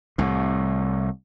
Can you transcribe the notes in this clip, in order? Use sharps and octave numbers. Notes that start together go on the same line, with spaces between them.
C2 A2